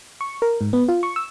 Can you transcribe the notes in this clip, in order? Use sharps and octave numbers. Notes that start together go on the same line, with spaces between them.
C#6
A#4
G#2
B3
F4
C#6
E6